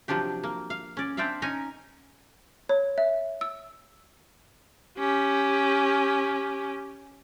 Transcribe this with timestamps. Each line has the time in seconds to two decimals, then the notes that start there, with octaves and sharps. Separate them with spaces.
0.08 C3 F3 F#3 D4 G4
0.43 A#3
0.70 F5
0.97 C#4 D5
1.17 C4 D4 C5 D5 E5 F5
1.42 C#4 D#4 G#5 A#5
2.69 C#5
2.98 E5
3.41 E6
4.98 C#4 G4